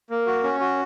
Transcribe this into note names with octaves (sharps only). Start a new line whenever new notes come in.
A#3
F#4
C#4
F#4